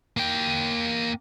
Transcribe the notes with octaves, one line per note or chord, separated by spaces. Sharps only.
A#3 G5